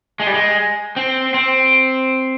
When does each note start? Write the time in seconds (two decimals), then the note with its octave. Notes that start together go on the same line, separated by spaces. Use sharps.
0.20 G#3
0.27 G3
0.34 G#3
0.96 C4
1.34 C4